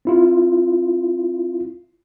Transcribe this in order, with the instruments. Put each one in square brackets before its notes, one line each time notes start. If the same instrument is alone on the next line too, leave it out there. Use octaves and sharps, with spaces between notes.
[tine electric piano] C4 E4 F4